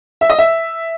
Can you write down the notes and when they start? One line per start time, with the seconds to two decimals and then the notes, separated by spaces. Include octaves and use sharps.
0.21 E5
0.30 D#5
0.39 E5